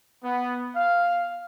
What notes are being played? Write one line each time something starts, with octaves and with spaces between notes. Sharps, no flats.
B3
F5